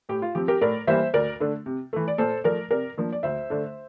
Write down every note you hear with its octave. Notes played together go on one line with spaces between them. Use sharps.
A2 G4
F4
F3 C4 G4
G4 A#4
A2 A#4 D5
E3 G3 A#3 C5 E5
D2 A#4 D5
D3 A3 D4
C3
E3 A3
D5
A#2 A4 C5
F3 A3 A#4 D5
C3 A#4 D5
F3 A#3 D4
D5
D2 C5 E5
D3 A3 D4